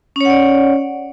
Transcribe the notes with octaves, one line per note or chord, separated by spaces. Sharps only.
C#4 C#5 D5 F#5